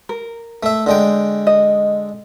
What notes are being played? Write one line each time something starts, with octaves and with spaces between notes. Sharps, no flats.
A#4
A3 E5
D3 G#3 G5
D#5